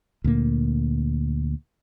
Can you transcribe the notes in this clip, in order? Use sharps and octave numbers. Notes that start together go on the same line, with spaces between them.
D2 A#2 A#3